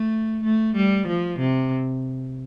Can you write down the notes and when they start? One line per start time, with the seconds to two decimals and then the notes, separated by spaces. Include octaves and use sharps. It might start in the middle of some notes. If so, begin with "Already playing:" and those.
Already playing: A3
0.44 A3
0.76 G3
1.07 F3
1.39 C3